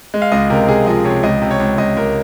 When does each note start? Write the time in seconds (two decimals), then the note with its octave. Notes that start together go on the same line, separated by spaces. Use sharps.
0.14 G#3
0.22 F5
0.32 C#2 D#5
0.50 C3 A#4
0.68 C3 G#4
0.87 F3 D#5
1.05 C3 C#5
1.23 C#2 D#5
1.42 C3
1.51 C#5
1.60 C#2
1.78 C#2 D#5
1.97 C#2 A#4